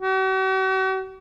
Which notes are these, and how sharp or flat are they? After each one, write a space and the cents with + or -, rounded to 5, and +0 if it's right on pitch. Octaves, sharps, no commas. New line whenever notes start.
F#4 +45